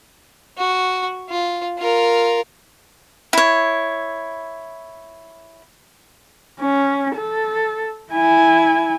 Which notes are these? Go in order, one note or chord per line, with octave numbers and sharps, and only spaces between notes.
F#4
F4
F4 A#4
E4 C#5
C#4
A4
E4 G#5